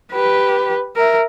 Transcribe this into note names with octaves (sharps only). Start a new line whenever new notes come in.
G4 B4
A#4 E5